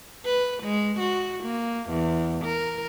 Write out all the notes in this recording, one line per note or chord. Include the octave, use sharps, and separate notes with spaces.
B4
G#3
F#4
A#3
E2
A#4